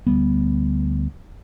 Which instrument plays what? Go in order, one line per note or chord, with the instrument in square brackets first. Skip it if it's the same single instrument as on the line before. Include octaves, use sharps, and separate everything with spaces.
[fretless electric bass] D2 G3 B3